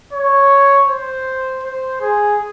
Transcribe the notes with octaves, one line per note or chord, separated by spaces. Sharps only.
C#5
C5
C5
G#4